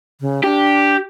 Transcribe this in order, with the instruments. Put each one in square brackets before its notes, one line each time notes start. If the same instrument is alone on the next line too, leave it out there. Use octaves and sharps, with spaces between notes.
[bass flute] C#3
[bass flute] D4 [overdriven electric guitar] G4